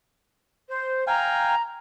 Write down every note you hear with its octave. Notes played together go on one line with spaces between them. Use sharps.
C5
F5 G5 G#5 A#5